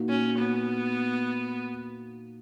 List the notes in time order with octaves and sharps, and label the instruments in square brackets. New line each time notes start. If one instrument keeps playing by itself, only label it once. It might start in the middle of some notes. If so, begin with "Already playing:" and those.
Already playing: [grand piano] A#2 A#3 D#4 F#4
[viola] C#4
B3